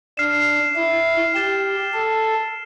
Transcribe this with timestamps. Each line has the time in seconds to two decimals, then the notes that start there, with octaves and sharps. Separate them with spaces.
0.17 D4 F6 C7 E7
0.76 E4
1.35 G4 A6 E7 G7
1.93 A4